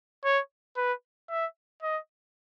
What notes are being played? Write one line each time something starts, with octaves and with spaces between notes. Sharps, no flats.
C#5
B4
E5
D#5